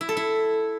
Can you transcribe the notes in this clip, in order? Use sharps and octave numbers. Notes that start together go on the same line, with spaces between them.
E4
A4
E4